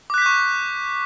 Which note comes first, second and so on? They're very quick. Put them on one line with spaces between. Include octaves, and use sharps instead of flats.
D6 F#6 B6 G6 C#6